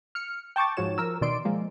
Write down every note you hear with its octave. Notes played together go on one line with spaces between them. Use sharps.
F6 C#7
G5 A5 C#6 D6 A6
G#2 F3 F#4 C#5 E7
F3 A#4 E6
B2 D#3 D5 C6 D7
F3 G#3 A#3